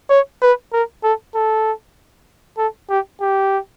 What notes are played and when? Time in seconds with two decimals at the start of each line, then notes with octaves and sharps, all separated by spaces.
0.10 C#5
0.42 B4
0.73 A#4
1.04 A4
1.35 A4
2.58 A4
2.90 G4
3.21 G4